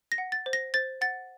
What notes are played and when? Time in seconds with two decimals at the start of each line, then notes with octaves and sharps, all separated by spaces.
0.12 A#6
0.18 F#5
0.32 A6
0.46 C5
0.53 A#6
0.74 C5 A6
1.01 F#5 A6